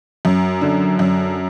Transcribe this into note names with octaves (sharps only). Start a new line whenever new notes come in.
F#2
D3
F#2